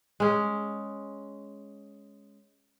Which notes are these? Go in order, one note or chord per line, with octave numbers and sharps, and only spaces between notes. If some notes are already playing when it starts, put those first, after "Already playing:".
G#3 C#4